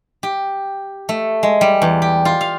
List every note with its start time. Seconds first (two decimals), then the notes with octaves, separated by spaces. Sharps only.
0.23 G4
1.09 A3
1.43 G#3
1.61 G3
1.82 E2
2.02 G4
2.25 F4
2.41 F5